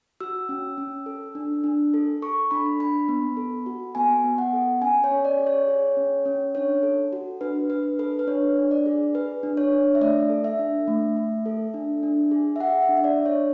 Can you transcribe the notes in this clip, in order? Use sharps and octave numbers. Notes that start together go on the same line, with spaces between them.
F#4 E6
C#4
C#4
A4
D4
D4
A4
A4 C#6
D4 B5
D4 B5
B3
A4
F#4
B3 G#5
B3
F#5
A4
C#4 G#5
C#5
C#4
D5
G#4
C#5
G#4
C#4
C#4
D4 C#5
A4
F#4
D4 B4
D4 B4
A4 B4
B4
D4 C#5
D4
D5
G#4
G#4 B4
D4
C#5
D4
E5
A3 D5
A4
E5
D4
A3
A3
A4
D4
D4
G#4
E5
G#4 F#5
E5
D4
E5
D5
D4
C#5